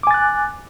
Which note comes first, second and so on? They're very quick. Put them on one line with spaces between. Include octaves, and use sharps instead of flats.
D6 G#5 A6 F#6